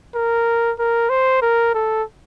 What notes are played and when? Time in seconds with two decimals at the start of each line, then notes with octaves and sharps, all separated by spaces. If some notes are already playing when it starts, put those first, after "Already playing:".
0.15 A#4
0.79 A#4
1.10 C5
1.42 A#4
1.74 A4